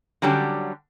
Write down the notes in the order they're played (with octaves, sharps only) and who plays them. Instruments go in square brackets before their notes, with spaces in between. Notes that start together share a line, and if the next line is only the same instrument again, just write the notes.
[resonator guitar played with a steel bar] D3 F#3 G3 C#4 G4